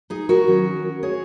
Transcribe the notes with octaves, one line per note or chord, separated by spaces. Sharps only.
D#4 G#4
F#4 A#4
D#3 F#3 C#4
G#4 C#5